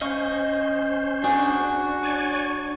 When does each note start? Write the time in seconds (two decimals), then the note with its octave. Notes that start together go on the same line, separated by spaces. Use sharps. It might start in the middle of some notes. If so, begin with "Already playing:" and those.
0.01 C#4 C5 D#5 F5 B5 C#6
1.24 D4 F#4 G#4
2.03 C#5 D5 G#5